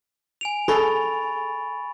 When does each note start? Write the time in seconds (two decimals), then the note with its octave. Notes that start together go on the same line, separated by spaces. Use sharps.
0.41 G#5 D7 F7
0.68 G#4 A4 B5 C#6 A6